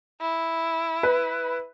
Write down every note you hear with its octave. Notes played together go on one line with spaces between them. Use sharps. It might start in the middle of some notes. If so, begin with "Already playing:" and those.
E4
B4